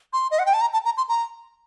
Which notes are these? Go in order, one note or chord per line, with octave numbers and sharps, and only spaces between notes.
C6
D#5
F#5
G5
A5
A#5
A5
A#5
C6
A#5